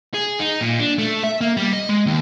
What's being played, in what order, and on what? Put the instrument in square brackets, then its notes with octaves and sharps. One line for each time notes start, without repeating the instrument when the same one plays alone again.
[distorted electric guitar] G#4
D#4
A#2
D4
A3
E5
A#3
G3
D#5
G#3
D#2